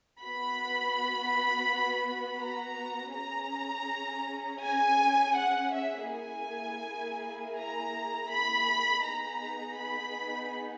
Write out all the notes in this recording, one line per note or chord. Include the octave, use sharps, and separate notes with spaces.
B3 F#4 B5
A#5
C#4 G#4 A#5
G#5
F#5
E5
A#3 E4 G#4 G#5
A#5
B5
B3 D#4 G#4 A#5
B5